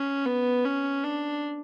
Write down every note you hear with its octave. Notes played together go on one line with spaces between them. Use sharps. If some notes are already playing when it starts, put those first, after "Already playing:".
Already playing: C#4
B3
C#4
D4